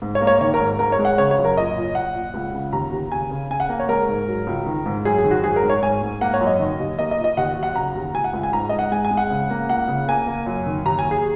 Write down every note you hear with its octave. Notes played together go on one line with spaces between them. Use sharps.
G#2
C#5
A#3
C#5
D#3 C#5
A#4
G#2
G#2 A#4
C#5
G#3
F#5
C#3 C#5
C#5
F#2
A#4
A#2 D#5
A#2
A#2 F#5
A#2
C#2
C#3
D#2 A#5
D#2
C#3 G#5
C#3
C#3 G#5
F#5
A#3
C#5
G#3 A#4
G#2
F#3
C#2
D#3
G#2
F#2 G#4
G#4
D#3
F#4
G#2 G#4
A#4
G#2
C#5
G#2 G#5
G#2
A#3 F#5
C#5
F#2
D#5
D#3
D#2
A#3 D#5
D#5
A#2
D#5
D#2 F#5
F#3
F#5
C#3 A#5
D#2
C#2 G#5
F#5
C#2
G#5
G#2 A#5
G#2 D#5
F#5
G#3 G#5
G#5
G#3
F#5
C#3
A#3
C#2 F#5
C#3
A#3 G#5
A#3
F#2
D#3
D#2 A#5
G#5
D#2
G#4